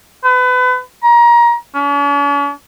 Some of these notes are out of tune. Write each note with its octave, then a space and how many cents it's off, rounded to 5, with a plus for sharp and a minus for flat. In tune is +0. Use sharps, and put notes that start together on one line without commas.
B4 +30
A#5 +25
C#4 +45